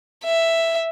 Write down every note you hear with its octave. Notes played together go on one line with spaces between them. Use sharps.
E5